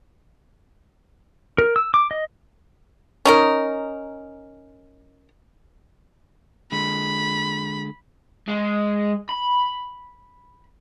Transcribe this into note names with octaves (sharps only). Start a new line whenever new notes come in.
A#4
E6
D6
D#5
C#4 D#4 A#4
D3 G#3 B5
G#3
B5